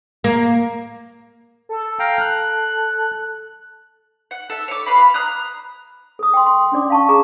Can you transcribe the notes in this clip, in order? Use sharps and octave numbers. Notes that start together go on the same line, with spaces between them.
A#3
A4
F5 G5 A#5
F#6
F#5
A4 E5
C#5 D6
B4 F5 B5
A#5 D#6 F6 F#6
A4 D#6
G5 C6
C6
C#4 D4 D5 D6
F5 A5 C#6
G#4 A#5 D6